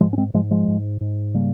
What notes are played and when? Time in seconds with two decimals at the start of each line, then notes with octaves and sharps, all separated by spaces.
0.01 G#2 F3 G#3
0.13 C#4
0.18 G#3 C4
0.34 G#2 F3 G#3
0.51 F3 G#3
0.68 G#2
1.01 G#2
1.34 C#3 G3 A#3